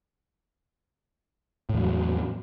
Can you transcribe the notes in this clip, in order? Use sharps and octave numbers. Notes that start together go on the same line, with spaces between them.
E2 A2 F#3